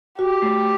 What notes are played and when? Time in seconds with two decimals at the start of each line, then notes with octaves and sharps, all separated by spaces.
0.18 F#4 G4
0.42 A3